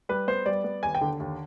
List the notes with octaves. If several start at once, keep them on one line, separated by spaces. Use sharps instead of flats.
G3 B4
B3 C5
G3 D5
B3
D#2 G#5
G5
D3
D#2